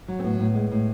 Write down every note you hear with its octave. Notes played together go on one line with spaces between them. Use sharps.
F#3
C4
A2 B3
A2
G#3
A2